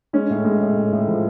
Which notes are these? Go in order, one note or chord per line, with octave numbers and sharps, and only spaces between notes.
G#3 C#4
A2
G#3
A2
A2
A2
F3